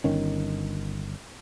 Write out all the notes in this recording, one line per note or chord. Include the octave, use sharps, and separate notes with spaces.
G1 D#3 C#4